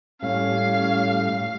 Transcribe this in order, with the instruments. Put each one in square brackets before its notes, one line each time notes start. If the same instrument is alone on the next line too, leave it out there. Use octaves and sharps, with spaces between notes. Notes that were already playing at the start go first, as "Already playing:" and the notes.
[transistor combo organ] A2 G3 [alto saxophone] C#4 [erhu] F5